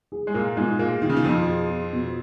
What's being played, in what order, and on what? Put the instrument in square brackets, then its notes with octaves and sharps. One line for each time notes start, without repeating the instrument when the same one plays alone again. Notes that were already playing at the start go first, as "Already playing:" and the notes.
[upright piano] G#4
[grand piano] G#3
[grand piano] A#2 A#3 [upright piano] F4
[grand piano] G#2 G#3 [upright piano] B2
[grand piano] A#2 A#3 [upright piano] G#4
[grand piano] D#3 [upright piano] F4
[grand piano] C#3
D#3
[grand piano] F2 F3 [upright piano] B2
[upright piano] G#4
F4
B2